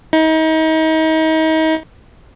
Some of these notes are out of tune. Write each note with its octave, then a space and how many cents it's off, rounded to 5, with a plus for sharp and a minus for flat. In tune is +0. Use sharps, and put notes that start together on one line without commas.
D#4 +35